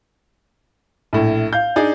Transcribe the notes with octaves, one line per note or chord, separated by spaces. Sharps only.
A#1 A2
F5 G6
D4 D#4 G#4 D5